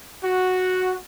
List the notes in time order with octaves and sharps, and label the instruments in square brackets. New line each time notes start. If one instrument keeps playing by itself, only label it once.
[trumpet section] F#4